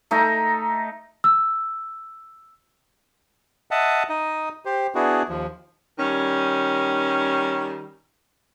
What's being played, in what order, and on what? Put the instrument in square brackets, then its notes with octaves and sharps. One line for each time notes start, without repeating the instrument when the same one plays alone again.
[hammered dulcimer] A3 D#4 A#5
[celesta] E6
[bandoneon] D#5 E5 F#5 A5
D#4 D#5
G4 C5
B3 D4 E4 F#4 G#4
D#2 F3
[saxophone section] D#3 G3 C#4